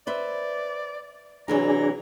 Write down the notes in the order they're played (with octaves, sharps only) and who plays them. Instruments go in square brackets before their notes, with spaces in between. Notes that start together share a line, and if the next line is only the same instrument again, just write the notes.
[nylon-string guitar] B4 C5 E5 [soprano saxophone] D5
[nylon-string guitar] C3 E3 F#3 [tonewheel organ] D4 G#4 [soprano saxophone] A#5